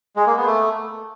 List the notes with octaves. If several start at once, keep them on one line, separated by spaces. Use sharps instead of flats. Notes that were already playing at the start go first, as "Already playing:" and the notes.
G#3
A#3
B3
A3